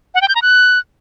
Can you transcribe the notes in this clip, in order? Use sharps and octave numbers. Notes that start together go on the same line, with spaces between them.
F#5
G5
G6
A#5
F#6